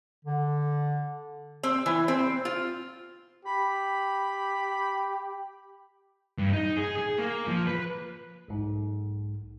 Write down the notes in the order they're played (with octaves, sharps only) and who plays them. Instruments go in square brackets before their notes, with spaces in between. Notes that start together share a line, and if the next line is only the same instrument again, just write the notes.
[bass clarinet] D3
[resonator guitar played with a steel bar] C4
E3
C4
F4
[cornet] G4 [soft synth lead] B5
[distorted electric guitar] G2
D#4
G#4
G#4
A#3
F3
B4
[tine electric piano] B1 G#2